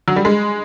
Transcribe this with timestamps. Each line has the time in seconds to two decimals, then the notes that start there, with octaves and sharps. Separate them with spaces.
0.08 F#3
0.16 G3
0.25 G#3